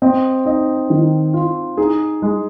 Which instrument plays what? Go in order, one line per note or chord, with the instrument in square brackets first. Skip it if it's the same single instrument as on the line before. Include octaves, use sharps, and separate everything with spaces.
[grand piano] C4 [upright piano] D#5
[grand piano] D#4 [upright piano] D#5
[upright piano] D#3
F4
[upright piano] D#4 [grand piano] G#4
[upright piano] G#3